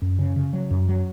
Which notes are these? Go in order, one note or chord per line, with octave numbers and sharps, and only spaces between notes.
F#2
C#3
C#3
F#3
F#2
F#3